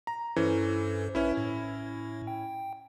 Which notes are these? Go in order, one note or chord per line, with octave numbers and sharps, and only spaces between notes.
A#5
G2 E3 C#4 A4 C5
A#1 C#4 E4 B4 E5
A2
G5